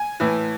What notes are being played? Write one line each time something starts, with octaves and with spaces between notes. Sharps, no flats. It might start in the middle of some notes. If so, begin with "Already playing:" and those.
Already playing: G#5
A2 E3